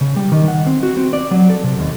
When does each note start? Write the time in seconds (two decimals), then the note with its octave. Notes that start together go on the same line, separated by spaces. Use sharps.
0.01 C#3
0.16 G3
0.32 D#3
0.48 F#5
0.66 C4
0.83 F#4
0.97 C4
1.13 D5
1.31 F#3
1.50 A4
1.64 C3
1.79 D#2